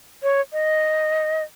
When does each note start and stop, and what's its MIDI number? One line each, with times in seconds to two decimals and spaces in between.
0.23 0.41 73
0.53 1.43 75